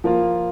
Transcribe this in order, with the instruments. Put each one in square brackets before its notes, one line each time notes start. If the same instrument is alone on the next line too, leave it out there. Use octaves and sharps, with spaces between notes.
[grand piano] F3 A#3 F4